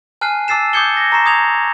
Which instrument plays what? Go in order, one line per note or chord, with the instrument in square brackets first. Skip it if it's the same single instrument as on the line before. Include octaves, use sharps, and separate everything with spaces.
[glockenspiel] G#5 A5 F6 F#6 C7 D#7
A5 D6 E6 A6 C7 E7
D6 D#6 G6 G#6 C#7 G7
A#6
A#5 C#6 C7 E7
D#6 G#6 F7